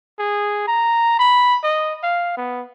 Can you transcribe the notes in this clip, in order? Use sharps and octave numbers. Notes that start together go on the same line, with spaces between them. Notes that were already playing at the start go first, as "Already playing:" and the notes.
G#4
A#5
B5
D#5
F5
B3